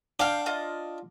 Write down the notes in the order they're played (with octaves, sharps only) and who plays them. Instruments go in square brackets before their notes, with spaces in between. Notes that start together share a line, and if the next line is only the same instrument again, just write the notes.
[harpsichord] D4 [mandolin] F5 G5 F6
[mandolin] F4 D#5